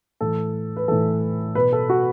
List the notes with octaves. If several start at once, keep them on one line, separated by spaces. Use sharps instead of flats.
A2 E3 A4
B4
A2 E3 A4
B2 B4
A4
F#4